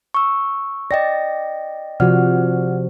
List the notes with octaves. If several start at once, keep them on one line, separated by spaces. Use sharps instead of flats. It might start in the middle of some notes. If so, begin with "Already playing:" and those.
C#6 E6
D5 D#5 G5 A#6
C3 F3 F#4 D5 F#5 F6